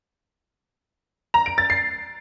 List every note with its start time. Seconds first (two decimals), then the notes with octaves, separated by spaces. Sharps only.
1.34 A#5
1.46 D7
1.58 A6
1.70 C7